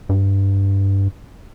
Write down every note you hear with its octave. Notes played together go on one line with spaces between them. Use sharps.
G2